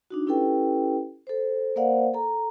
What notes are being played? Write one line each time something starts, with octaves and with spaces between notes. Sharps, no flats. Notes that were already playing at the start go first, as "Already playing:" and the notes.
D4 D#4 F#4
C#4 E4 G4 A4 B4 G5
A4 C5
A#3 A#4 C5 D5 F5 F#5
A4 A#5